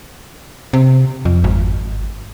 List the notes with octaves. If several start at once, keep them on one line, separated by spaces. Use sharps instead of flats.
C3
F2
G#1